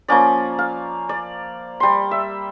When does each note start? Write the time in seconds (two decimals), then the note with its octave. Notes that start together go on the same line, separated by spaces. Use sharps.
0.08 F3 A#3 C#4 D5
0.59 F5
1.09 D5
1.80 G3 C6
2.11 E5